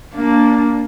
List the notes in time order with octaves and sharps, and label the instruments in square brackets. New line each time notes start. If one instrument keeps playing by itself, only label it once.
[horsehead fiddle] A#3 D4